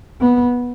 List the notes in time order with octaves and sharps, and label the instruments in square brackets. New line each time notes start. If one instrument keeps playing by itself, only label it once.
[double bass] B3